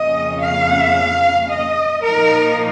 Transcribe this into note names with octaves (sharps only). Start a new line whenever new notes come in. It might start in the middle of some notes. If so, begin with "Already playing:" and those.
Already playing: F2 C#3 A#3 C#4 D#5
F5
D#5
A#2 F3 A#3 D#4 A#4